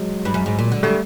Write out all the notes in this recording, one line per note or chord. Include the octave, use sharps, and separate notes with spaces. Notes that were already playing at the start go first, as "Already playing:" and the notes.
Already playing: F#3 G#3
G2
F#2
G#2
A#2
D3
D3 G3 A3